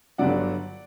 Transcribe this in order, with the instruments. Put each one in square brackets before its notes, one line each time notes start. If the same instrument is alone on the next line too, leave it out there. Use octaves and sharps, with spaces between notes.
[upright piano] G1 G2 F#3 D5 F#5